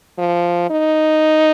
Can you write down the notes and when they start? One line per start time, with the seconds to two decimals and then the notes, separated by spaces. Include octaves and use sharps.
0.18 F3
0.70 D#4